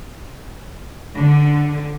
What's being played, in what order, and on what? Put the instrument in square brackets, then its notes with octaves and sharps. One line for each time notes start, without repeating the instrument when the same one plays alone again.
[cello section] D3